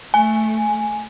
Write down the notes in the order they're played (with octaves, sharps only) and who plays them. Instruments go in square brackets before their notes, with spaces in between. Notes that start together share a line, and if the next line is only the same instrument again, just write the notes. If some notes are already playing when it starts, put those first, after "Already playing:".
[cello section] A3 [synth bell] G#5